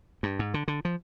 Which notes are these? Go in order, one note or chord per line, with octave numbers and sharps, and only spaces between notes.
G2
G#2
D3
D3
F3